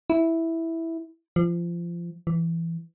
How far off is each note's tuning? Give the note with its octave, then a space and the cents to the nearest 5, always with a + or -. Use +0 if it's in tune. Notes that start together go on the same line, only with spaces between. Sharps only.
E4 -5
F3 -25
E3 +15